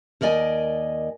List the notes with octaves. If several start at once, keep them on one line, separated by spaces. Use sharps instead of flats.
D#2 A#4 D5 D#5 G#5